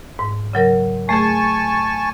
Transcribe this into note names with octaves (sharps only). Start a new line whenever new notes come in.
G#2
C#3 F#3 A#4
A3 G#4 G#5 A5 C#6